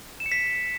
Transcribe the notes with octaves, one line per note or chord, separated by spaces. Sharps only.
E7
C#7
B6